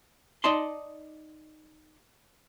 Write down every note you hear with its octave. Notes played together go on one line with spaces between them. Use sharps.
D#4 D5 D#5 A5 C6